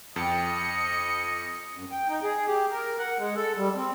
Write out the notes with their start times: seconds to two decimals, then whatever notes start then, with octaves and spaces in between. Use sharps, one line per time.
0.16 F2 D#5 G5 A5 C#7
1.75 F#2
1.91 G5
2.09 D#4
2.23 G#4
2.47 G4
2.71 A#4
2.98 F#5
3.18 G#3
3.36 A4
3.57 G3
3.76 C4